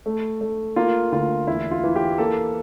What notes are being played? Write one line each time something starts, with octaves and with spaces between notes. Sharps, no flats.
A3
A3
A#3 F4
D2 F4
E2 E4
F4
E3
G4
A#3 A4